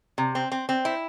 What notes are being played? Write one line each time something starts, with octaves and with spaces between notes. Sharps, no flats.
C3
C4
C4
C4
E4